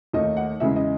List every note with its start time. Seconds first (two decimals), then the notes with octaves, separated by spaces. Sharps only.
0.13 D#2 D#3 A3 D#4 D#5
0.37 F#5
0.60 E2 C#3 G#3 E5
0.76 D#5